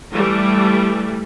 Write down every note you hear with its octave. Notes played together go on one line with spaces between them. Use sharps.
E3 G3 A3